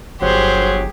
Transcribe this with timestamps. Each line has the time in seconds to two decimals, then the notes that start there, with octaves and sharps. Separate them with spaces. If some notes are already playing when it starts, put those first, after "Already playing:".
0.22 G1 F#3 G4 G#4 C5